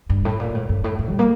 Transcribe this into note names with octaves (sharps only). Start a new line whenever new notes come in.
G2
A2
A#2
A2
G2
A2
A2
G3
A#3